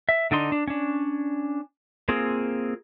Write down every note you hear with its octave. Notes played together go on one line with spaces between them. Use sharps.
E5
D3 D4 D#4 C6
D4
C#4 D4
A#3 C4 F4 G#4